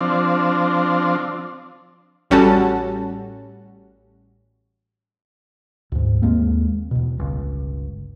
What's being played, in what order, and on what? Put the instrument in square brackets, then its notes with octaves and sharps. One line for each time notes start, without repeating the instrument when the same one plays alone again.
[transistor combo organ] F3 C4 D4
[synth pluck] A1 G3 C#4 F#4 A4 A5
[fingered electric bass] D2 G#2
D#2 G#3 A#3 C4
E2 B2
G1 C#2